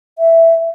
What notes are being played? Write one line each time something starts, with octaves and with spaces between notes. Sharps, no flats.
E5